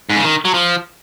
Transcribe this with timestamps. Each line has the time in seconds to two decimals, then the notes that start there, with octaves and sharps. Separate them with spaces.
0.10 G#2
0.17 C#3
0.24 D#3
0.45 F#3
0.54 F3